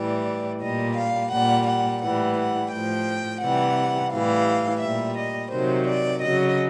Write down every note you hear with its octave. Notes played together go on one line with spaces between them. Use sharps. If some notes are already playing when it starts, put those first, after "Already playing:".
Already playing: A2 E3 G3 D5
A#2 G3 D#5
F5
A#2 G3 F#5
F#5
A2 E3 G3 F#5
F#5
A2 F3 G5
C3 E3 G3 F#5
A2 E3 G3 F5
A#2 G3 E5
D#5
C3 D#3 F#3 C5
D5
C#3 F#3 D#5